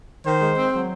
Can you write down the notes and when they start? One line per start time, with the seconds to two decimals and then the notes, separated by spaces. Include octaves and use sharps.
0.25 D#3 C5
0.41 G#3
0.56 C4
0.72 F#3